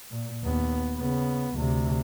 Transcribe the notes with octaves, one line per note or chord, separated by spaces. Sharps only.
A#2
D#2 B3
C#3 B3
D2 C3